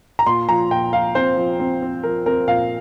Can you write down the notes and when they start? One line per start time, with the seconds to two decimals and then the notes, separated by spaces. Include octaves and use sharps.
0.19 A#5
0.27 A#2 C6
0.49 F3 A#5
0.71 A#2 G5
0.93 F3 F5
1.15 C4 C5
1.37 F3
1.60 C4
1.82 C4
2.03 F3 A#4
2.26 C4 A#4
2.48 A#2 F5